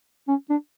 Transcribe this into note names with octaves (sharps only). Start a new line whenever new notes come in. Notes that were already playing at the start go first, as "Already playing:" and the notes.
C#4
D4